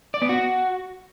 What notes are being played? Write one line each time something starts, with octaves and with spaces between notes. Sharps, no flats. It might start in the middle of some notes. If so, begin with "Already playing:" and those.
D5
B3
F#4